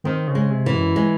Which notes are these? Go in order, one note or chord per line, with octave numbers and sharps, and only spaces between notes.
D#3 C4
C#3
G#3
C3
E3
F#2
G#3